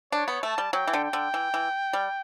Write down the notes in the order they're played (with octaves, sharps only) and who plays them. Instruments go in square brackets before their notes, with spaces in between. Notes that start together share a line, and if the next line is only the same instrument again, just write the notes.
[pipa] D4 [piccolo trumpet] C#5
[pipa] B3
[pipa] A3 [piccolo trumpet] A5
[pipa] G3
[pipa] F#3 [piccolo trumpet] G5
[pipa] E3
D3
[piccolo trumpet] G5
[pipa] D3
E3
E3
G3